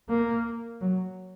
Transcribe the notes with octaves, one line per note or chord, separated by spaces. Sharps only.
A#3
F#3